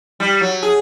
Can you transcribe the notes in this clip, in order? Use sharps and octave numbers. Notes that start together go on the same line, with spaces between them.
G3
F#3
G#4